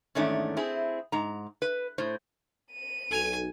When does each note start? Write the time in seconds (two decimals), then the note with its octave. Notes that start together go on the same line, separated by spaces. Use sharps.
0.15 E2 G#2 D#3 A3 C#4 D4
0.57 C4 E4 G#4
1.12 G#2 A#5
1.62 B4
1.98 A2 C5
2.72 D#7
3.11 B1 A4 G#5 F7